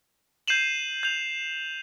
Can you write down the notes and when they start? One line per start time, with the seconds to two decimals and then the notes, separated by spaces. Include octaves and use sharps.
0.48 G6 C7 D#7 E7 F#7
1.03 G6 F7